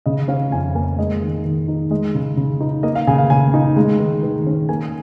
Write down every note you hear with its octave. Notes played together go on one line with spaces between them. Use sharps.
C#3 D#5
C#4 F5
F2 G#5
A#3 G#5
G#3 D#5
D#3
D#3
D#4
G#3 D#5
C#3
C#3
D#4
A#3 D#5
F5
C#3 G#5
F5
C#3 G#5
D#4
G#3
D#3
D#3
C#4
A#3 G#5